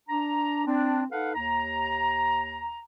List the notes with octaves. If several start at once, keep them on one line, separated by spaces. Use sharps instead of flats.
D4 A#5
C4 D4
D#4 A4 B4 F5 F#5
D#2 A#5